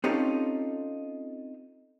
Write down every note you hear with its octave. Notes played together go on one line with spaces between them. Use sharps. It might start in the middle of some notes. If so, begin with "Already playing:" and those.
C4 C#4 D#4 F4 G4 A4